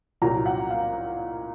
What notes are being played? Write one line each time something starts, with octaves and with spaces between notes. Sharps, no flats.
C2 A#2 F#3 A#5
F#5
F5